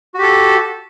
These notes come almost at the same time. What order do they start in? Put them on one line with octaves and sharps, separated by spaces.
F#4 G4 A4